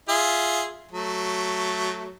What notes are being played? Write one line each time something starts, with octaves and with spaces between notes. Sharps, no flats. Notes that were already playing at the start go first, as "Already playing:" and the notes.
F4 G#4 E5
F#3 A3